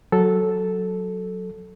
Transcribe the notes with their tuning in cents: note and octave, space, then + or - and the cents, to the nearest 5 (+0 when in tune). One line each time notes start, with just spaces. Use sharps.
F#3 +0 A4 -5